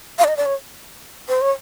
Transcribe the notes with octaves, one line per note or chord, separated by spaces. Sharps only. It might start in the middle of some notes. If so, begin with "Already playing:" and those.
F5
D5
D#5
D5
C#5
C5
C#5